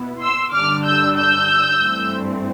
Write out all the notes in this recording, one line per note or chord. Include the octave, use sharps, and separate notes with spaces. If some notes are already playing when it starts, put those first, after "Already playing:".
Already playing: B2 B3 E4
C6 E6
G2 D3 G3 D4 D6 F6
E6 G6
E6 G6
G2 E3 A3 C4